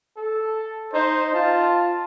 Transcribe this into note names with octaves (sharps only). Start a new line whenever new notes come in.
A4
D#4 C5
F4 A5